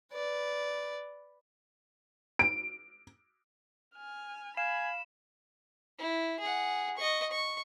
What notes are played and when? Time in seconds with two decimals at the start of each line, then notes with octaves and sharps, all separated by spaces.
0.12 B4 D5
2.39 D7
3.95 G#5 F6
4.57 F5 G#5 B5 E7
5.99 E4
6.40 G#4 F#5
6.97 D#5 C#6
7.31 C#6